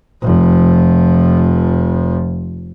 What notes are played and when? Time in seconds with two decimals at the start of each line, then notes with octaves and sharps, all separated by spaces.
0.23 F1 F3